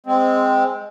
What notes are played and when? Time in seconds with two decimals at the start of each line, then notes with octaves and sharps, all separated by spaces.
0.06 G#3 C4